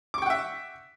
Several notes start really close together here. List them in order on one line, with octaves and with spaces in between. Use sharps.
D6 C#6 G5 F#5 E5